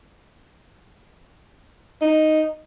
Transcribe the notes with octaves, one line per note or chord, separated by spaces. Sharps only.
D#4